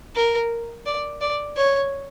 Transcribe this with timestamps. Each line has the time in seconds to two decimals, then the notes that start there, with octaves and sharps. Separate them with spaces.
0.16 A#4
0.86 D5
1.21 D5
1.57 C#5